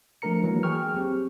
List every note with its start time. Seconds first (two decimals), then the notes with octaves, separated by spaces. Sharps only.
0.22 F3 A3 D4 A#4 A#5 C#7
0.43 E3 F#3 G#3 A#3
0.63 F#3 G#4 G5 C#6 F6
0.96 C4 G4